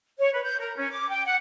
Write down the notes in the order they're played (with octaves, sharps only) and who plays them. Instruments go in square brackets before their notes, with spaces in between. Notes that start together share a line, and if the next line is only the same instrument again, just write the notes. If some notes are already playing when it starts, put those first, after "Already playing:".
[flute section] C#5
B4
G6
A#4
C#4
D6
G5
F#5